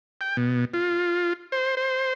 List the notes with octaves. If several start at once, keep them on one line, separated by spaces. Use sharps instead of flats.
G5
B2
F4
C5
C5